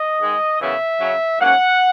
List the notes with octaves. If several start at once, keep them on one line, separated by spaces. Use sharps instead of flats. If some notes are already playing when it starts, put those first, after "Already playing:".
Already playing: D#5
G#2 D#3 G#3
F#2 C#3 E3 B3 E5
C#3 F#3 C#4
G#2 F#3 A#3 C#4 F#5